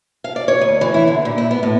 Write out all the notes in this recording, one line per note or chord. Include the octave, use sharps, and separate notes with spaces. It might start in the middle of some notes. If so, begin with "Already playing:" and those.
F5
D5
C#5
D2
E3
E4
D3
A#2
E4
B3
A2